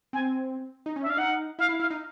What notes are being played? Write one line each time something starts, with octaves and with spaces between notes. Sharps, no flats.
C4 G#5
D#4
C#4
E5
D4
F5
D#4 F#5
E4 F5
E4
E4 F5
D#4